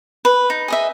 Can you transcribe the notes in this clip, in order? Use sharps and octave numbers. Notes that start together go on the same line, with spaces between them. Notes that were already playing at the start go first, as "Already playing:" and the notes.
B4
D#4
G#4 D#5 E5